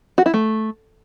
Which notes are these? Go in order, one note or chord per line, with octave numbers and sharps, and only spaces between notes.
F#4
E4
A3